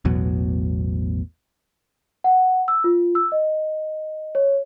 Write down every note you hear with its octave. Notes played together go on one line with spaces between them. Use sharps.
A1 E2 B2 F#3
F#5
E6
F4
E6
D#5
C#5